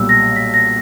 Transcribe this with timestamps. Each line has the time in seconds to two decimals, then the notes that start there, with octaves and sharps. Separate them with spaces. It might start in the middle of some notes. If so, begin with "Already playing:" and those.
Already playing: B1 A#2 G3 E6
0.09 A#6
0.36 B6
0.54 A#6